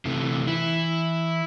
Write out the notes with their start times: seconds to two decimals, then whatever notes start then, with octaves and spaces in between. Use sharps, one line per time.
0.05 C3 E3 A3
0.47 E3 E4